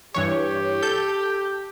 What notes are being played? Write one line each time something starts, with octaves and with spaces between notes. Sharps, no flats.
G2 E3 G4 C#5
A4 G6